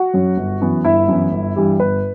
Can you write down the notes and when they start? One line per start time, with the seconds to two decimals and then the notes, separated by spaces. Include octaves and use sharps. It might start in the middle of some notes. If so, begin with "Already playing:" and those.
Already playing: F#4 F#5
0.13 F#2 F#3
0.37 G1
0.61 F#2 E3 B3
0.85 G1 E4 E5
1.08 F#2 E3 B3
1.31 G1
1.56 G2 E3 G3
1.79 G1 B4